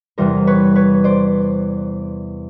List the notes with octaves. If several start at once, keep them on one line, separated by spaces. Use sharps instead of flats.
E2 C3 E3 G3 A#4 C5
B4 C#5
B4 C#5
C5 D5